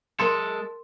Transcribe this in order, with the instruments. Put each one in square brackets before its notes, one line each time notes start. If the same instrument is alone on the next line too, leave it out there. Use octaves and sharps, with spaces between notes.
[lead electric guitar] G#3 A4 [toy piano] A#4 C6